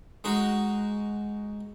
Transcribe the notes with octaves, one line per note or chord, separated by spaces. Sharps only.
G#3 D#4 F#4